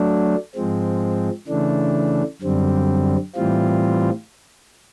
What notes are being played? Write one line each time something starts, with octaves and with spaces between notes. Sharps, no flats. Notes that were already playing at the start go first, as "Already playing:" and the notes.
Already playing: F#3 A3 D4
G#2 F3 G#3 C4
C#3 E3 A3 D4
F#2 D3 G3 C4
A2 E3 G3 C4 F4